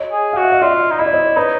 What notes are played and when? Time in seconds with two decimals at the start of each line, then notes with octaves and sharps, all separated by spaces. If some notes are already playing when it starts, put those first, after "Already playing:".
Already playing: C#5 D#5
0.12 G#4
0.33 F#4 F5
0.43 E5
0.52 D#5 F5
0.62 F4 D5 E5
0.91 D#4
0.99 E4 D#5
1.06 D5
1.13 C#5 D#5
1.27 D5
1.36 D#4 B4 C#5